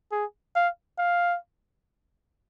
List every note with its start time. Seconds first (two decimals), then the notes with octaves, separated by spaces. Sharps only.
0.12 G#4
0.56 F5
0.98 F5